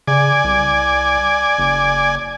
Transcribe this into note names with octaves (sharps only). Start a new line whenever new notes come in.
C#3 D5 G#5
C2
F#1